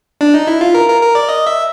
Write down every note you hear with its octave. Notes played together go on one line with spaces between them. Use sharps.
D4
D#4
E4
F4
A#4
A#4
A#4
D5
D#5
E5